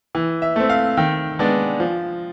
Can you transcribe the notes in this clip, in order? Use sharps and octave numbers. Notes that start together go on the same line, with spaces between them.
E3
E5
A3 C4
F5
D#3 G5
G#3 B3 D4
F3